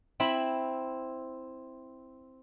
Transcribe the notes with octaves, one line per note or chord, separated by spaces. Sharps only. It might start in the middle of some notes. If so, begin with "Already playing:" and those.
C4 E4 B5